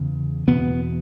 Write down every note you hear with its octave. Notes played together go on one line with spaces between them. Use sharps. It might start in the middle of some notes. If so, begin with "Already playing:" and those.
Already playing: E2 C#3
E2 B2 B3